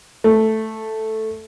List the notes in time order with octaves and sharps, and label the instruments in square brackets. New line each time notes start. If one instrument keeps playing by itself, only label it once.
[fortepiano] A3